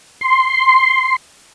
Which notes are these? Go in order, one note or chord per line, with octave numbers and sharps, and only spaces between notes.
C6